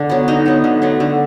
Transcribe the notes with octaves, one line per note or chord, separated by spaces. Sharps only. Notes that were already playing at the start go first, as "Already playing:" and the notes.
Already playing: D3 D4
F#3 B3
D3 D#4
F#3 B3
D3
F#3 A3
D3